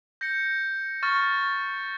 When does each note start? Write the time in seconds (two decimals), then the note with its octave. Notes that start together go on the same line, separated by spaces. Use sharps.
0.21 G6 A#6 C#7
1.03 C#6 F6 A6